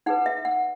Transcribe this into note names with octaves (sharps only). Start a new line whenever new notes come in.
D#4 G#4 B4 F#5
E5
F#5